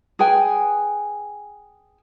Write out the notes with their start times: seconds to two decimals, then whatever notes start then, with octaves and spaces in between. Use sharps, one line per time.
0.19 G#4 B4 G5 G#5